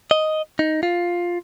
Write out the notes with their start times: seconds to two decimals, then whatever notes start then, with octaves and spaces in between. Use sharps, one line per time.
0.11 D#5
0.59 D#4
0.83 F4